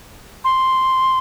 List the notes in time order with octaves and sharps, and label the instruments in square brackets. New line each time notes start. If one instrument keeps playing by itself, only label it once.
[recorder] C6